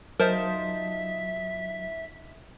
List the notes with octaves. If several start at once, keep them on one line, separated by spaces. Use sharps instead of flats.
F#3 D#4 F4 A#4 C5 E5 A5